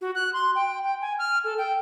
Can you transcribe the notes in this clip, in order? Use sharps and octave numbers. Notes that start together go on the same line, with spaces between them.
F#4
F#6
C6
G5
G5
G#5
F6
A4
G5